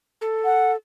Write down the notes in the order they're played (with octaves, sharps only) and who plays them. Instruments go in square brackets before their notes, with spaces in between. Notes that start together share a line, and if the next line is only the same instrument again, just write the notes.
[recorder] A4
[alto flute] F#5